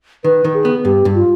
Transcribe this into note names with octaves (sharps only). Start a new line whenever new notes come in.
D#3 B4
D#3
G#4
B3
G2 G4
G2
F4